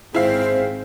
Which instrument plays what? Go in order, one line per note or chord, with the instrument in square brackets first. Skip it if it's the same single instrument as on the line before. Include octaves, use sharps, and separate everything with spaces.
[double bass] G#1 C4 [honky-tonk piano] E4 F5 [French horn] G#4 [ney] C5